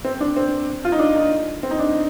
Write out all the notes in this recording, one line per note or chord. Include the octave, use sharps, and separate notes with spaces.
C4
D4
C4
F4
D#4
D4
D#4
C4
D#4
D4